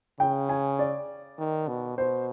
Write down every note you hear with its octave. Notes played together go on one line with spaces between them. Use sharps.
C#3 G5
G#5
D5
D#3
B2
B2 C5